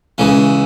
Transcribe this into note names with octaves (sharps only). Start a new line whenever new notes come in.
C#2 C#3 E3